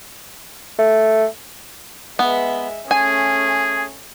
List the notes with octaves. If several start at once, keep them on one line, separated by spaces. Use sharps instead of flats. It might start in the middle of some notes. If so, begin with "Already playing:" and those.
A3
G#3 B3 E5
A3 C#4 G#4 G#5